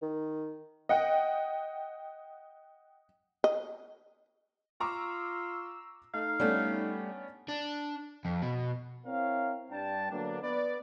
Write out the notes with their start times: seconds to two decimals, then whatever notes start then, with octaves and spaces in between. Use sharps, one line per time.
0.02 D#3
0.89 D#5 F#5 G5
3.44 D#5
4.80 F4 A#5 C#6 D6 E6
6.14 A3 D#4 F5
6.40 G3 A3 B3 C#4 D4
7.49 D4
8.25 F2
8.42 B2
9.06 C4 E4 A#4 C#5 F5
9.71 G2 D4 G5 A5
10.11 D3 F#3 A#3 B3 D4
10.43 B3 B4 D5